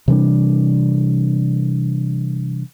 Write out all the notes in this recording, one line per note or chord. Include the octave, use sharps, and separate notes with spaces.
C3 E3 G3 D4